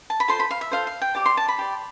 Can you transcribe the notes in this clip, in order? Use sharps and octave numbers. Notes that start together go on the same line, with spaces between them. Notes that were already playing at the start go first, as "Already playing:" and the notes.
A5
B5
F4 A4 C5 C6
B5
F5
E5
F4 A4 C5 F5
F5
G5
G4 D5 D6
C6
A5
B5
G4 D5